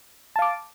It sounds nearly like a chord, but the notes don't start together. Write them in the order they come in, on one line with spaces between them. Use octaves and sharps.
A5 F5 D6